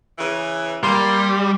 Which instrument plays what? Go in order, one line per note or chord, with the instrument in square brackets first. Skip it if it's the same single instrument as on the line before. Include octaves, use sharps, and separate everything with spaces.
[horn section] C#3 E3
[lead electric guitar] G3 [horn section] A#3 [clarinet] C6